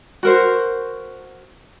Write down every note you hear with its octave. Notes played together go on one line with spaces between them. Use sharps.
F#4 A#4 C5